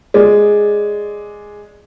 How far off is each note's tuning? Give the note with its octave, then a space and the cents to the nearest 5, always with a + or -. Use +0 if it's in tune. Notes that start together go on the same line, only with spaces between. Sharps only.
G#3 +0 D5 +0